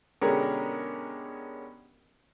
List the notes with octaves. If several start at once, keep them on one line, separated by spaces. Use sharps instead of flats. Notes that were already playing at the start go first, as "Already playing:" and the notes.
B2 D3 G#3 C#4 G4 A#4